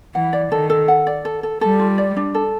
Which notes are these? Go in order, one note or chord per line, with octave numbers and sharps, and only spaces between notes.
E3 F#5
D5
D#3 A4
A4
F#5
D5
A4
A4
G3 A4
F4
D5
D4
A4